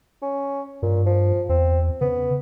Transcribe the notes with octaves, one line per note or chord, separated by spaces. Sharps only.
C#4
G2 A#2
F3
E2 C4
C#3 B3